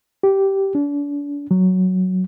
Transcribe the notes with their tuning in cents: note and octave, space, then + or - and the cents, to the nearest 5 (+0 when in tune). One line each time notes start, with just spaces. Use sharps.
G4 -10
D4 -35
F#3 +0